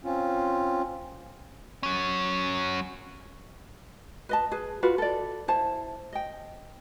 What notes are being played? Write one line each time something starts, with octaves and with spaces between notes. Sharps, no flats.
C4 C#4 F4
F#3 C#4
B4 D#5 A5
G#4 B4
F4 F#4 B4
A4 D5
E4 C5 A5
D#5 G5